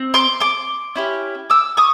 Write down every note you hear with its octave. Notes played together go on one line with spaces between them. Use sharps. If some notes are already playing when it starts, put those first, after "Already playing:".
Already playing: C4
C6 D6
C6 D6
C#4 E4 G4
D6 E6
C#6 D#6